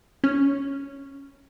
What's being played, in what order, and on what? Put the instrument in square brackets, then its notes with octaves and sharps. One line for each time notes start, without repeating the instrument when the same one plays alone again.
[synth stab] C#4